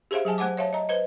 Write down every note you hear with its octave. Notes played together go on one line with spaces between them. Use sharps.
G4 G#4 C5 E5 F5
F#3 G#4 G#5 A5
A3 C5 F#5 G#5 D6
C#5 E5 F5 A5
D#5 A#5
B4 C5 D#5